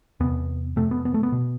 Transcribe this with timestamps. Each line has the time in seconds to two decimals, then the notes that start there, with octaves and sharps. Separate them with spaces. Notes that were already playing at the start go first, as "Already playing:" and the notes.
0.20 E2 C3 B3
0.76 F2 C3 A3
0.91 B3
1.05 B3
1.14 A3
1.23 B3
1.32 B2